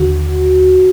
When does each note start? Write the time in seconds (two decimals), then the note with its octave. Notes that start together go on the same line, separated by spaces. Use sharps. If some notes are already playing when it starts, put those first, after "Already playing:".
Already playing: D#2 D3 F#4